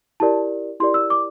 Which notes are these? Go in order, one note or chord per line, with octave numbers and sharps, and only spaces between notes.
E4 G4 A#4 D5 A5
E4 G4 A#4 D5 C6
E6
D6